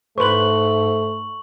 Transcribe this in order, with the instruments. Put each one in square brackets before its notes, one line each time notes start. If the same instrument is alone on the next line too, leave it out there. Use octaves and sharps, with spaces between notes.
[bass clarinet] G#2 [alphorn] A3 [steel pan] B4 C5 [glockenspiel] C#6 F#7